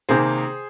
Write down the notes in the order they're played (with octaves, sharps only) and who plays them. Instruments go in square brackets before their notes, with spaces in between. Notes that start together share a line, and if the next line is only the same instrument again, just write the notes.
[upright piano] C3 D#3 A#3 G#4 C5